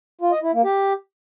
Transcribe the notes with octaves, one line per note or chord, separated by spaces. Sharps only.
F4
D#5
E4
A#3
G4